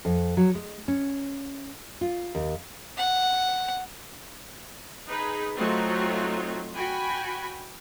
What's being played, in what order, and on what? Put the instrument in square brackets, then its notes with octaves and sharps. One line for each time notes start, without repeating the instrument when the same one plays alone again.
[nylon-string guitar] F2
F#3
G#3
C#4
F4
D#2
[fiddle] F#5
[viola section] D#4 G#4 B4
F#3 A3 C4 D#4 F4 F#4
F#4 G5 G#5 B5